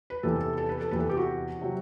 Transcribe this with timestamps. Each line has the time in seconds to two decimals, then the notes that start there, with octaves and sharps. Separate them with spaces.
0.10 B4
0.23 E2 C3 E3 A4
0.41 A4
0.58 A4
0.69 B4
0.81 A4
0.91 E2 C3 E3 B4
1.00 A4
1.09 G4
1.17 F#4
1.61 C3 F#3